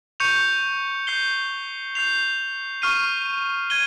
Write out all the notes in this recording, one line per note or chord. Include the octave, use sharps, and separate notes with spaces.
C#6 G6 C#7 F7
G6 C7 G7
G6 C7 F7
C#6 F6 C7 D#7
G#6 D#7 G7